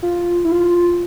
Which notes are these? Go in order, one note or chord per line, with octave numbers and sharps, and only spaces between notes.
F4
E4
F4